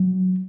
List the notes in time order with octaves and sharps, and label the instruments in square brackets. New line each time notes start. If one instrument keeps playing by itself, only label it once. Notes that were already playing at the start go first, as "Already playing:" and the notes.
Already playing: [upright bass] F#3